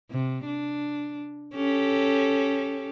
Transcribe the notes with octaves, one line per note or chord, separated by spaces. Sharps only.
C3
D4
C#4 G4 A4